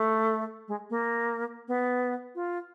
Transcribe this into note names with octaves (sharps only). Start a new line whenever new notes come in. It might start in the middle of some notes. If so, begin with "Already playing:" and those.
Already playing: A3
G#3
A#3
B3
F4